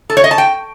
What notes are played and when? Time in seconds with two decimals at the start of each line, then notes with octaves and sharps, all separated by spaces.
0.10 A4
0.17 C#5
0.24 D#5
0.31 A5
0.38 G5